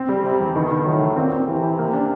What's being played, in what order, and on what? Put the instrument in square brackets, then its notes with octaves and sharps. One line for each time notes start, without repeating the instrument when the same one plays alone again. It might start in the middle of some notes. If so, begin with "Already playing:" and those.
Already playing: [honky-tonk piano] C4
G3
[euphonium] C3 [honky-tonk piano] G3
[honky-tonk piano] E2
[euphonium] B2 [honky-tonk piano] D#3
[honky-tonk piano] D#3
[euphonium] A2 [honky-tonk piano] F#3
[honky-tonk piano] D#3
[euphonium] A#2 [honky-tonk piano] C4
[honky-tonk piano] C4
[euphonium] C3 [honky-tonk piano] E3
[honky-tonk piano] E3
A#3
D4